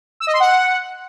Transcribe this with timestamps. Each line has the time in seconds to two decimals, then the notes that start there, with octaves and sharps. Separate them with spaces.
0.20 E6
0.27 D#5
0.33 C6
0.40 F#5